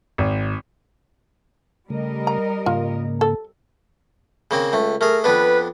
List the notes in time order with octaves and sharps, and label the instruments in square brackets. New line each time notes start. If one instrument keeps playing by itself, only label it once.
[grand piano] G#1
[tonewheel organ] C#3 A3 [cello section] G3 A#4 D#5
[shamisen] A#5
[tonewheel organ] G#2 C#3 A#3 [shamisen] F4
[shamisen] A4
[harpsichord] C#3 A#3 C4
C#2 A3
[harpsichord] A3 G#4 [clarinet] A#4
[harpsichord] F2 B3 D4 [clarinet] B4